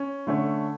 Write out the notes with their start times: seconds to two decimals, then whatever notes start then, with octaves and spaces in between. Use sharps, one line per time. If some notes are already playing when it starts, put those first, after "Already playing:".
Already playing: C#4
0.27 D3 A3 C#4